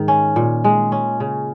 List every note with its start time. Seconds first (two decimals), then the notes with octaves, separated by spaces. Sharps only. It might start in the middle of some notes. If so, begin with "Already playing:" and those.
Already playing: G#2 D#3
0.08 C#4
0.36 A#2
0.64 G#3
0.92 C#4
1.20 C#3